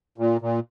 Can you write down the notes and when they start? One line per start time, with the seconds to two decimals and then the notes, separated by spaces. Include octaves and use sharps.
0.18 A#2
0.41 A#2